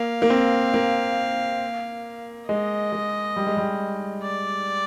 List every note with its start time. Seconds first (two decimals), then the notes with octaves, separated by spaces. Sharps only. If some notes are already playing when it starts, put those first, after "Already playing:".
Already playing: A#3 F5
0.22 A#3
0.30 C4
0.74 A#3
2.49 G#3 D#5
2.93 G#3
3.36 G3
3.47 G#3
3.57 G3
4.23 D5